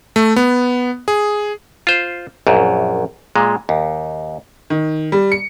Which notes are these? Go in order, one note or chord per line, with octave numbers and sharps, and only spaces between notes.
A3
B3
G#4
F4 C5
A#1 F#2
A#2 G#3
D#2
D#3
G3
C#7